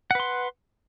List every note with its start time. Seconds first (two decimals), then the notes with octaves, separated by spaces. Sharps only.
0.11 F#5
0.15 B4
0.20 C6